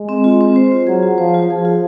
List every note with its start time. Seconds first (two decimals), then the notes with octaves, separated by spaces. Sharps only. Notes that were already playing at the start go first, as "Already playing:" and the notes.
Already playing: G#3
0.09 C4
0.24 F4
0.41 C4
0.56 C5
0.72 F4
0.87 F#3 G#4
1.03 F4
1.18 F3 C5
1.34 F4
1.50 F3 G#4
1.65 F4